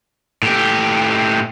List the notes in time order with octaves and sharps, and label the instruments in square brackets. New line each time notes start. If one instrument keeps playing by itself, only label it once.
[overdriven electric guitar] A2 G4